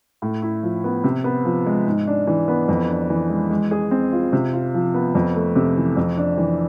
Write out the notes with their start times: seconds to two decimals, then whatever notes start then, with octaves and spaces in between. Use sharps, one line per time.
0.22 A2
0.42 E4
0.63 F3
0.84 B3
1.04 C3
1.24 B3
1.45 F3
1.66 G#3
1.86 G#2
2.07 D4
2.27 E3
2.48 B3
2.68 F2
2.89 D4
3.10 E3
3.30 G#3
3.50 G#3
3.71 G#4
3.91 C4
4.12 F4
4.33 C3
4.53 F4
4.74 F3
4.94 B3
5.15 F2
5.36 A3
5.56 C3
5.77 E3
5.96 F2
6.17 D4
6.38 E3